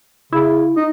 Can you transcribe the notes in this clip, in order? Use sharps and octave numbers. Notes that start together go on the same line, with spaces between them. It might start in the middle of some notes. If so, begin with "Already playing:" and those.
C#3 E4
D#4